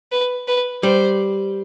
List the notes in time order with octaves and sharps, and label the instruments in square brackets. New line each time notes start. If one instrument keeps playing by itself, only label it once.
[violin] B4
B4
[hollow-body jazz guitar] G3 [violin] C5